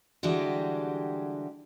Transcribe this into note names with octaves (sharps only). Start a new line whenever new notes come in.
D3 E3 G3 G#3 F#4 G4